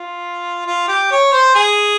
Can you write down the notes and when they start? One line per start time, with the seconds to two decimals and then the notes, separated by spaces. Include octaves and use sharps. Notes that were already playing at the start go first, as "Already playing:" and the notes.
Already playing: F4
0.66 F4
0.88 G4
1.11 C#5
1.32 C5
1.55 G#4